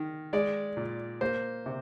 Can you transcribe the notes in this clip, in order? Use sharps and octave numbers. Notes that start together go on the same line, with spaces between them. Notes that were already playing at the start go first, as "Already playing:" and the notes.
Already playing: D#3
G#3 D5
A#2
A#3 C5
C3